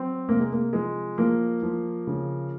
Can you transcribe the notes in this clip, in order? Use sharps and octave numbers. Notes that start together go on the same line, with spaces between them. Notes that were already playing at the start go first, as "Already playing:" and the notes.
Already playing: F#3 C4
C3 A#3
G#3
A#3
F3 G#3
F3 A#3
F3
C#3